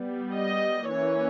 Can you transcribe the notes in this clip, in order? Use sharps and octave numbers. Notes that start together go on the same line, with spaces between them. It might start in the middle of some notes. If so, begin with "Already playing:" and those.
Already playing: G3 B3
D#5
E3 A#3 C#4 C#5